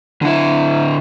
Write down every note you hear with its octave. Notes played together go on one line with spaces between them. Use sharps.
D3 E4